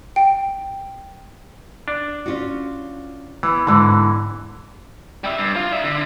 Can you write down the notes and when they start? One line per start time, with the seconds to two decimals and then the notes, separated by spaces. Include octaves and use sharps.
0.16 G5
1.88 D4
2.26 C#4 F4 F#4
3.43 E3 B3
3.67 E2 G#2 D3 E3
5.24 G3 E5
5.38 G2
5.56 F4
5.72 D4 E5
5.84 D3